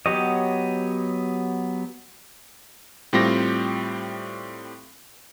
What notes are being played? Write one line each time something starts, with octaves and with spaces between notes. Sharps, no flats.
F#3 B3 G4 C#5 D#5
A2 G3 C4 F4 G4 A#6